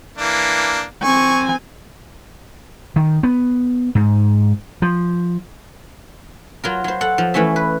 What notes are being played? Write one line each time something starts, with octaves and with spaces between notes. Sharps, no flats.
E3 A#3 D4
C4 G#5 C#6
D#3
B3
G#2
F3
F#3 F4 A#4
F#3 C5
A4 F#5
F3
E3 A3 C#4 E5
B4